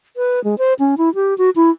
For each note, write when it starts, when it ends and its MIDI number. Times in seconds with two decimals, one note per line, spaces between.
0.17 0.43 71
0.44 0.58 56
0.58 0.74 72
0.79 0.95 61
0.98 1.13 64
1.15 1.37 67
1.38 1.50 66
1.56 1.70 64